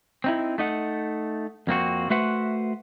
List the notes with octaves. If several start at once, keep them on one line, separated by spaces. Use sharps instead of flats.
C4 D#4 E4
A3 D#4 F#5
F2 A#3 C4 F#4
A3 F#4 B4 C5 E5 F#5